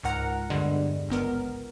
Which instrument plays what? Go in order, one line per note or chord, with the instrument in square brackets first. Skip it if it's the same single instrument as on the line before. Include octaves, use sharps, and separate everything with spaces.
[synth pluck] C#2 G#2 A#4 F#5 A#5
E2 G2 D3 G3 G#3
G#1 C#2 B3 A#4